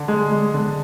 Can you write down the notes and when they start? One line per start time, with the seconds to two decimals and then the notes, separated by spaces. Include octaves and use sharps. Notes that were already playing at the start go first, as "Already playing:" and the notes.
Already playing: D3
0.08 G#3
0.31 G#3
0.54 D3